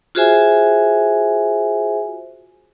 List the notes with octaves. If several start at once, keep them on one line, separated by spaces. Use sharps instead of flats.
F4 F#4 G#4 C5 E5 G#5